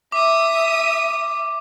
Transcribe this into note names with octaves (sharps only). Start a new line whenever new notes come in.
E5 D6 D#6